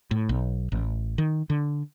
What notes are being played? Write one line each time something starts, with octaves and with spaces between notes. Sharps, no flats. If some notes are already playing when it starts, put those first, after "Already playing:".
A2
B1
A1
D#3
D3